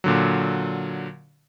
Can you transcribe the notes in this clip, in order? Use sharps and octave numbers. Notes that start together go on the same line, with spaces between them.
A#2 D3 F#3